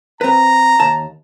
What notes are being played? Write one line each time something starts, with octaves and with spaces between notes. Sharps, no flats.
C4 B4 A#5
D#2 A5